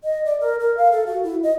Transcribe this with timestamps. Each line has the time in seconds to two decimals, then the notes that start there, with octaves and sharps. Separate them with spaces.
0.04 D#5
0.25 D5
0.40 A#4
0.60 A#4
0.77 F5
0.92 A4
1.07 F#4
1.23 E4
1.43 D#5